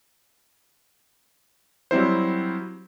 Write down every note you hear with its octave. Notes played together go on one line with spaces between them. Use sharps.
F#3 G3 C4 E4 C5